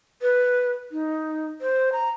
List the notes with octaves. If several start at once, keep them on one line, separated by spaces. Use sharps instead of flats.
B4
D#4
C5
A#5